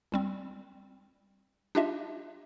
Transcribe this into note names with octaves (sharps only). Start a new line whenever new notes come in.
C2 G3 C4
D4 D#4 F4 G4 D#5 E5